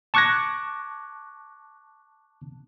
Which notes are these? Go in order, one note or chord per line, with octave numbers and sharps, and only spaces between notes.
A5 C#6 D6 F#6 G#6 A#6